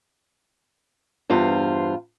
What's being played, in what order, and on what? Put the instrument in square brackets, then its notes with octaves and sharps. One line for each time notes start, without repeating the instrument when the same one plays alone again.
[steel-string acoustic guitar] E2 G2 F4 C5